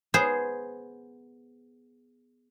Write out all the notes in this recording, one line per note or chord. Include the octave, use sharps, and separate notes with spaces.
B3 G#4 C5